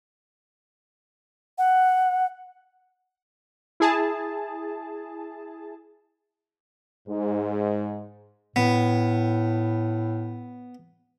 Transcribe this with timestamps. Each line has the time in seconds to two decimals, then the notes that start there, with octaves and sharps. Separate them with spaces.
1.58 F#5
3.80 E4 G#4 A5
7.08 G#2
8.56 A2 B3